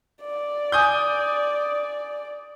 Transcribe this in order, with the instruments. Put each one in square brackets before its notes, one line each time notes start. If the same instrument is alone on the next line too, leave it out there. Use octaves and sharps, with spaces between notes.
[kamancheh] D5
[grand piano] G#5 D#6 G6